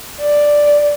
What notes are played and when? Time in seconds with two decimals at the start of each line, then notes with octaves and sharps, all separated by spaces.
0.20 D5